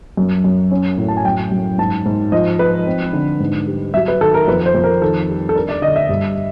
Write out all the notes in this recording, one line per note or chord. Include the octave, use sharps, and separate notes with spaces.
F#2
F#2
C#4
A2
A5
G#5
F#2 G5
F#2
G#2 A5
G#2
F3 D#5
F3 B4
C4
D3
G#2
G3
F#3 E5
B4
D#3 A4
A#4
F2 B4
C5
F2
A#4
D#3 A4
G3
A4
D4 A#4
D5
D3 D#5
E5
G2